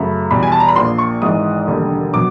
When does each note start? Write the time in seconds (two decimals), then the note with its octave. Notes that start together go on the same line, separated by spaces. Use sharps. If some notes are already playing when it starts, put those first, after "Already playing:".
Already playing: F#2 C#3 F#3 A3 B5
0.30 E2 B2 G3 B5
0.43 G#5
0.52 A5
0.60 A#5
0.68 B5
0.76 A#1 A#2 F3 C6
0.98 C#6
1.22 G#1 G#2 E3 G#3 D#6
1.67 E1 D#2 D3 G3
2.13 B2 F#3 D6